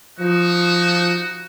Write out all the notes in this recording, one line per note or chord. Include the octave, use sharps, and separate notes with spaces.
F3 D#4 F#4